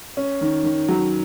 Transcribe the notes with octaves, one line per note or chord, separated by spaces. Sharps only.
C#4
D#3
D#3
F#3